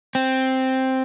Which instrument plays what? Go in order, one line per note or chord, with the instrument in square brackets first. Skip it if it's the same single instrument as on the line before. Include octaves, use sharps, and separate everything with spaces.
[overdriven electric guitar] C4